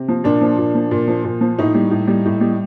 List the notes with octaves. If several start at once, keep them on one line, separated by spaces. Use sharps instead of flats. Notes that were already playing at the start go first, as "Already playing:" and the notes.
Already playing: C3
F3
A#2 D4
F3
A#2
F3
A#2
F3
A#2
F3
A2 D#4
G3
A2
G3
A2
G3